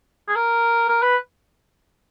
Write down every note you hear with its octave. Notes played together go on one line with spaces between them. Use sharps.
G#4
A#4
A#4
B4